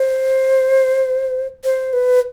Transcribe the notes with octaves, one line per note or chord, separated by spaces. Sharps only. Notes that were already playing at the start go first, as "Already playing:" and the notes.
Already playing: C5
C5
B4